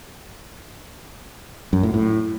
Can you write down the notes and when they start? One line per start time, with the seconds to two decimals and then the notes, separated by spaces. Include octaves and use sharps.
1.73 F#2
1.83 A2
1.94 A2